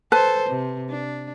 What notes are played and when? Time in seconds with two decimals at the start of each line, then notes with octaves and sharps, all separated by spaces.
0.12 A4 B4 C5 A5
0.49 C3
0.89 D4